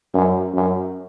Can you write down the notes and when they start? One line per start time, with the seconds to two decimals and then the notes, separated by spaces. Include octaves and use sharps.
0.14 F#2
0.54 F#2